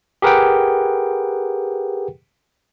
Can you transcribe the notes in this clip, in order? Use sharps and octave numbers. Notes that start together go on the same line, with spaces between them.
G4 G#4 A#4 B4 F#5 G5